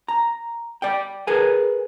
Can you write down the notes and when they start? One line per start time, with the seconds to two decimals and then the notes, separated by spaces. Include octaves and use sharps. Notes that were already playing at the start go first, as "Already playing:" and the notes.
0.08 A#5
0.82 D5 G5
1.27 G#4 A#4 B4 G#5